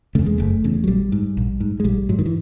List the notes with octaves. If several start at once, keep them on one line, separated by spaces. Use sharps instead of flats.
E2 C#3 A3
G#3
F#1 A3
E2 C#3
F#3
A#1 G3
G#2
A#1
G#2
G#3
A#1 G3
G#2 F#3
D#3
E3